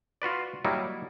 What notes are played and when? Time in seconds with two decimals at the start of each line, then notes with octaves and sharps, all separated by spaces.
0.22 F4 F#4 B4 D5
0.65 F#3 G3 A#3 D#4 E4